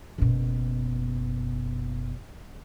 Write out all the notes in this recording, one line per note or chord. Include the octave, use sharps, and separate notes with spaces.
F#1 B2